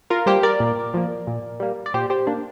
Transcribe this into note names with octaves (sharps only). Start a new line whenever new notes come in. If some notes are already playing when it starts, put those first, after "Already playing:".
F4 A#4
G3 A#3 G4 C5
A#4 D5
A#2
F3 A#3
A#2
G3 A#3
D5
A#2 G4 C5
G4 C5
A#3 D4